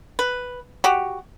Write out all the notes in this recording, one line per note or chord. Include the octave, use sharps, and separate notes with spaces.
B4
F#4 G4